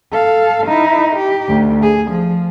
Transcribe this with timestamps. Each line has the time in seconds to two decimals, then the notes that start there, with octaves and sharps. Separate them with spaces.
0.12 A4 F5
0.67 D#4 E4
1.16 G4
1.48 D2
1.82 G#4
2.12 F3